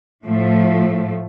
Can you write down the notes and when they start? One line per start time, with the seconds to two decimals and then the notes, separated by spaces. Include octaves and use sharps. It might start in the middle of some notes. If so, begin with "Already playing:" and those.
0.24 A2 F3 A3